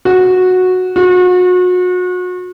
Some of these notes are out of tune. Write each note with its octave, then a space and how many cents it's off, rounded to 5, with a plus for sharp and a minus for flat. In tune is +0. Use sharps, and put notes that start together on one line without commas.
F#4 -10
F#4 -35